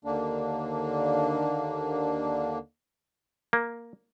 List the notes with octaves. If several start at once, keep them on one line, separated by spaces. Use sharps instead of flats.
D#2 D3 A#3 D4
A#3